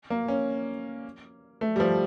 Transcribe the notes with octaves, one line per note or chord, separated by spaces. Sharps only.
A#3
C#4
A3
G3
F3